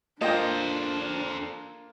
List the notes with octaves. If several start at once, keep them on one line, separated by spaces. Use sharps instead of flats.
A#3 D4 F4 A4 C5 D#5 G5